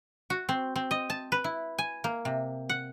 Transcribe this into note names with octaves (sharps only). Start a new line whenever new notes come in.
F#4
C4
C4
D#5
A5
B4
E4
G#5
A#3
C3
F#5